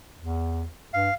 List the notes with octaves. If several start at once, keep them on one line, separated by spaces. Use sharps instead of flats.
E2
G2 F5